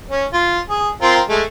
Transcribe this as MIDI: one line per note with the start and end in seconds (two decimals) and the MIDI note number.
0.11 0.25 61
0.33 0.60 65
0.70 0.89 68
0.70 0.89 87
1.02 1.21 60
1.02 1.21 65
1.02 1.21 70
1.29 1.43 56
1.29 1.43 57